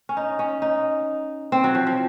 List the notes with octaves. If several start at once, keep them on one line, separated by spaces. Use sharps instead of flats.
C#4
D#4
C#4
D#4
C4
F#3
F3
F3